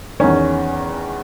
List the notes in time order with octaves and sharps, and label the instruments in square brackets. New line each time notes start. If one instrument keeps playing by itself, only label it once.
[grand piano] E2 D#3 C#4